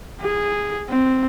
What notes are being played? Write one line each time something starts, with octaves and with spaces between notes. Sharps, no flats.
G#4
C4